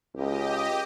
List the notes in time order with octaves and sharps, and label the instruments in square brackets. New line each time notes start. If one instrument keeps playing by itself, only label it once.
[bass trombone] C#2 [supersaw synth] G4 D#5